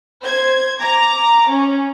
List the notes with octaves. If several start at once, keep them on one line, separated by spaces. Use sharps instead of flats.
C5 G#6
A#5 D6
C#4